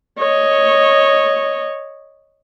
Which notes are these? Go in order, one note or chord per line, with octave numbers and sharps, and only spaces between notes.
C#5 D#5